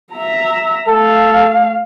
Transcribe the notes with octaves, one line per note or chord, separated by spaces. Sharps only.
E5 A#5
A3 A4 F5